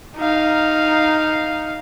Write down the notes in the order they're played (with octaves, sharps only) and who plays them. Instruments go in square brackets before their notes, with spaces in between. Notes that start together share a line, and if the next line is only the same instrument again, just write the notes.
[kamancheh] D#4 F5